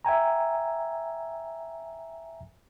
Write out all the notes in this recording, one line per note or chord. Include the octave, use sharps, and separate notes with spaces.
E5 G5 G#5 A#5